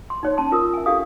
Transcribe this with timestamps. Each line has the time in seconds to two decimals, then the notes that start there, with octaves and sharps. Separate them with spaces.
0.10 C6
0.23 D#4 C#5
0.37 C#4 A5 C6
0.52 F4 A#4 D#6 E6
0.74 E5 G#5
0.86 D4 G4 A4 F5 D#6